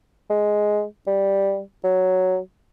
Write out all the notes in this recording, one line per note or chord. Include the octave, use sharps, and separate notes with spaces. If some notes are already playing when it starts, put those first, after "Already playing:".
G#3
G3
F#3